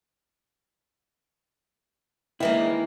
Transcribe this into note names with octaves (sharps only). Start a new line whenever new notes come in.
D#3 E3 G#3 A#3 E4